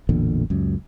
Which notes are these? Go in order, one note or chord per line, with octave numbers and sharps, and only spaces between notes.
A1 E2 A#2 D3
C#2 F#2